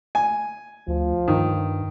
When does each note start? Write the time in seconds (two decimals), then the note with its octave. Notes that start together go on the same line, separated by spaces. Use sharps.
0.15 G#5
0.88 D2 F3
1.28 G2 D#3